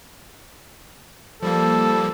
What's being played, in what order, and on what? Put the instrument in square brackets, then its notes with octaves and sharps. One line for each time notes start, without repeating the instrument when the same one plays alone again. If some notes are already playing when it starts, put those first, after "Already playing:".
[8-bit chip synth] F3 G3 A#3 [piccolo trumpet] A4